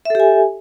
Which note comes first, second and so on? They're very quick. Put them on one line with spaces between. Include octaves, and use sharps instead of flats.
E5 A4 G4 G#5